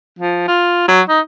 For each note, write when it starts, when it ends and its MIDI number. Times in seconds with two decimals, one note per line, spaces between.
0.19 0.44 53
0.48 0.86 65
0.88 1.02 54
1.09 1.20 63